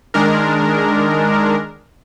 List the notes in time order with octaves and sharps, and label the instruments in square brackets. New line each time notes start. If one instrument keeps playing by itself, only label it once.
[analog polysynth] D#3 G#3 D4 A#4